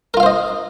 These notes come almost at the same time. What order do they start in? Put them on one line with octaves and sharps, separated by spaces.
A#4 F4 F5 C5 D#5